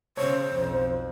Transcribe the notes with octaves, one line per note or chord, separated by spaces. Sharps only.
C#3 C5 C#5
B1 F2